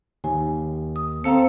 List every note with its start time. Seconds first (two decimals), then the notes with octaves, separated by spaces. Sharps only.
0.24 D#2 G#5
0.96 D#6
1.24 C4 A4 C5 F5 A#5 C#7